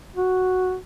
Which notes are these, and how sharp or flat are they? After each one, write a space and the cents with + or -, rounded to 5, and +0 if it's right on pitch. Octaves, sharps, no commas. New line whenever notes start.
F#4 +0